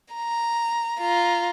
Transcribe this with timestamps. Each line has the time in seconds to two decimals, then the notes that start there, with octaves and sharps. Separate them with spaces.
0.15 A#5
1.00 F4 A#5